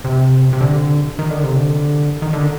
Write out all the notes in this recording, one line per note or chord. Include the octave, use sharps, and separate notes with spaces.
C3
C3
D3
D#3
D3
C3
D3
D#3
D3